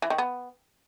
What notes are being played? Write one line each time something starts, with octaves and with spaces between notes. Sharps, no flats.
E3
D#3
B3